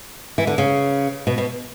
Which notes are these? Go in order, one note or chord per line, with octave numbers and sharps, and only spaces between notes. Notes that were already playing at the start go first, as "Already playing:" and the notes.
E3
D3
C#3
B2
B2